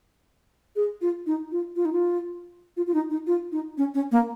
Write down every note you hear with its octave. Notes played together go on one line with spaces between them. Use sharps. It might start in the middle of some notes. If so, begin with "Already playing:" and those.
G#4
F4
D#4
F4
F4
D#4
F4
F4
F4
D#4
D#4
F4
D#4
C#4
C#4
A#3